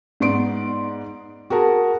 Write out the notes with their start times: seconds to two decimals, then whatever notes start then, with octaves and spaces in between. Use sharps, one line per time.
0.20 G#2 B3 D5 C6 D7
1.50 F#4 G#4 A#4 A5